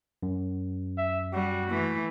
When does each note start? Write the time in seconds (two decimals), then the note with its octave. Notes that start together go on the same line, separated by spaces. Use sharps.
0.23 F#2
0.98 E5
1.33 G3 F#4
1.70 E3 A3